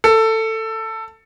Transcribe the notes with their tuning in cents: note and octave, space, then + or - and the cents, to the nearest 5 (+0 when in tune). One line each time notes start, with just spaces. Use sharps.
A4 +15